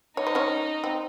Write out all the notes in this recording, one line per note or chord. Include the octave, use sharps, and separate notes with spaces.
D#4 C#5
C5
C#4 C#5
C4